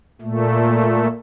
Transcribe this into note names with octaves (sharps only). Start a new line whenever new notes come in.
A#2 A3